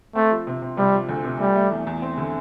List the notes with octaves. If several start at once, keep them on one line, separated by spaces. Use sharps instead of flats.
A3 C4
F3
C3
C3
C3 G3
F3
D2
C3
G3 A3
A3
E2
E2
C4
D3